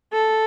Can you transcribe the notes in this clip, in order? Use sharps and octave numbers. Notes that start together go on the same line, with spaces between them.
A4